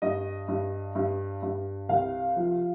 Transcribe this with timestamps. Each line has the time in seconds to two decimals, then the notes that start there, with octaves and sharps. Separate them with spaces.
0.02 G2 D#5
0.48 G2
0.95 G2
1.42 G2
1.89 C2 F5
2.36 F3